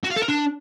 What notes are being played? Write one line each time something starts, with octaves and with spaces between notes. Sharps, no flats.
F#4
F5
A4
A#4
D4